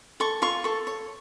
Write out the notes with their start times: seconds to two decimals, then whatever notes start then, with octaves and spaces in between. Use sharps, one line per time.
0.20 A4 C#6
0.42 F4 C#6
0.64 A4 C#6
0.87 C#5